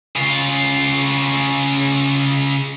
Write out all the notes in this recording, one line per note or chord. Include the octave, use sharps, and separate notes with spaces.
C#3 F4